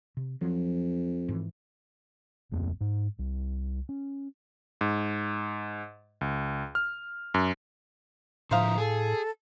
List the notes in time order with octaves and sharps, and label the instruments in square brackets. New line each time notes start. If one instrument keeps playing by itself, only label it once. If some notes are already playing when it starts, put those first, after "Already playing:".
[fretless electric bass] C3
[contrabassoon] F2 [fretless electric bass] F3 F#3
[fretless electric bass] G#2 E3
[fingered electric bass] D1 F2 A#3 C4
G#2
C2
C#4
[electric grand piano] G#2
C#2
F6
F#2
[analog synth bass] A2 [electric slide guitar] D3 F3 [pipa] C5 F5 [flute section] E5 A#5 D#6
[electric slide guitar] G#4 [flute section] A4